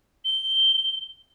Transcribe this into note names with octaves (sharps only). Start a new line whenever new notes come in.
G7